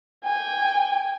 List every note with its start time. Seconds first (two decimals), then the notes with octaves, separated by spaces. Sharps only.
0.24 G5 G#5